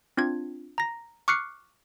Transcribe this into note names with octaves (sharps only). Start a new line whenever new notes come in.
C4 D4 F4 G#6
A#5 A#6
C#6 D6 F6 F#6 C7 C#7